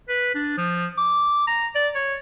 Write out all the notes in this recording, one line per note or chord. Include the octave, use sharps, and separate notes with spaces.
B4
D4
F3
D6
A#5
D5
C#5